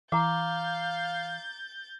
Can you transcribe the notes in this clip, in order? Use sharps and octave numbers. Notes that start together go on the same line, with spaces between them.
E3 F5 A#5 D6 G6 A6